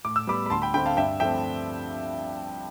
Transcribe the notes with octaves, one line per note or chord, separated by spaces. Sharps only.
A2 D6
E6
G3 B3 B5 D6
B5
D2 A5 C6
G5 B5
D3 A3 C4 G5 B5
F5 A5
G2 E5 G5
F3 A3 C4 E5 G5